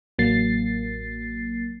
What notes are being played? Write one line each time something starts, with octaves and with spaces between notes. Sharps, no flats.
A1 F#3 A#3 A6 C7